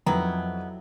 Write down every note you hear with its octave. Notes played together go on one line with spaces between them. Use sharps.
F2 D#3 F#3 B3 E4